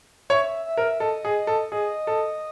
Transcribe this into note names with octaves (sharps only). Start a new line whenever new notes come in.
C#5 E5
E5
A#4
A4 D#5
G#4
A4
G#4 D#5
A4